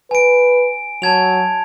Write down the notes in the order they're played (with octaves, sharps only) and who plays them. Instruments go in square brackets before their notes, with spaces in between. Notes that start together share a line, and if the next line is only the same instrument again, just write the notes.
[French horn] B4 [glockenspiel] G#5 D7
[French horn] F#3 [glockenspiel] A5 G#6 F7